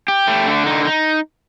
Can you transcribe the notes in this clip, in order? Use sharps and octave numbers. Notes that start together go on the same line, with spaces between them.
G4
A3
D3
D#4
D#4